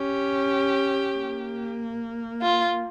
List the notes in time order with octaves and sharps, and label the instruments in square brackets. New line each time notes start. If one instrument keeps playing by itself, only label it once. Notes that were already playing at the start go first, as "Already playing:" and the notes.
Already playing: [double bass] C#4 [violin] G4
[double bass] A#3
[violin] F4